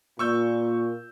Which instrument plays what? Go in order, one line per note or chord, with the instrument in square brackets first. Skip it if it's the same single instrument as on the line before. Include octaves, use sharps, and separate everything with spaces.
[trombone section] A#2 [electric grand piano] C#6 E6 G6